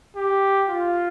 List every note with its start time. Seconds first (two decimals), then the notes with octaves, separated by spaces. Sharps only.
0.16 G4
0.68 F4